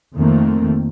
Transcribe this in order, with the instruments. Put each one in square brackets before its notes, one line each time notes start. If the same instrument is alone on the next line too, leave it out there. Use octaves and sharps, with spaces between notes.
[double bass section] F2 D#3 A3 A#3 C4